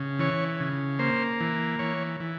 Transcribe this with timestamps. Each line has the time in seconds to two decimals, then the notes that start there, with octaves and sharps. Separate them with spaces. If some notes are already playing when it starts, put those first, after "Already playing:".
Already playing: C#3
0.19 E3 C#5
0.60 C#3
0.99 A#3 C5
1.40 E3
1.79 E3 C#5
2.20 E3